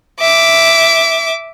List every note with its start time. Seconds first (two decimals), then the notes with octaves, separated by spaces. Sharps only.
0.21 E5 D6